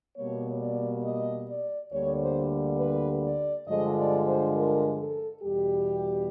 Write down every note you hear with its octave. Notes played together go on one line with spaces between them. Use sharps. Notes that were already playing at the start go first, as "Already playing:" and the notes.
B2 G3 A#3 C#5
D5
D#5
D5
D2 D3 G3 A#3 C#5
C5
B4
D5
G2 D3 F3 G#3 D#5
D5
C5
A#4
A4
E2 B2 G3 G4